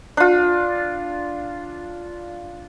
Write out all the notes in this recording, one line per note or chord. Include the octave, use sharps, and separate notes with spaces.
D4 F4